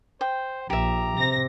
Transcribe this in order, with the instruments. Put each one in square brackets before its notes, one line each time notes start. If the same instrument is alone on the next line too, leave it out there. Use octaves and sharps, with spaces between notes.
[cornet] C5 [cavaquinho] G5
[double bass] A#1 [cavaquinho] G4 E5 [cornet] A#5
[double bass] C3 [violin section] A#6